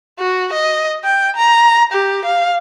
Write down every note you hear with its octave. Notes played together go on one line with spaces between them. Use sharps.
F#4
D#5
G5
A#5
G4
F5